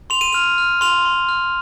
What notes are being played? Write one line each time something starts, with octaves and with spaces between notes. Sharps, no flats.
C6 F7
D#7
F6 F7
F6
C6 F7
C6
F6